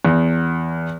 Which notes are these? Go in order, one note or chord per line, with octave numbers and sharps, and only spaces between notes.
E2